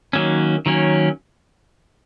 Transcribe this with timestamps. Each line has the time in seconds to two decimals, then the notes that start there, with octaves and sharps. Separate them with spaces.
0.13 D#3 F#3 A#3 C#4
0.66 D#3 F#3 A#3 C#4